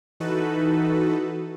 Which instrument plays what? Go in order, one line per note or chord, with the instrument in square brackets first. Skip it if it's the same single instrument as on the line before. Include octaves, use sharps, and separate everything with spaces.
[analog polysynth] E3 D#4 F#4 A4 B4